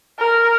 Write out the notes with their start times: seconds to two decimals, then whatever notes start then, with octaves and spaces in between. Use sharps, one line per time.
0.19 A#4